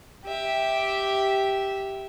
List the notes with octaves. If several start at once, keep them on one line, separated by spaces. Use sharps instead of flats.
G4 E5